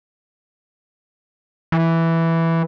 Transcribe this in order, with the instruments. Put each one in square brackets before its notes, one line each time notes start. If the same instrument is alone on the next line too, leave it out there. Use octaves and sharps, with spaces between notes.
[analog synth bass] E3